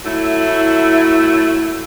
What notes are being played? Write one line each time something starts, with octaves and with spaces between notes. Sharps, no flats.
F#3 A3 E4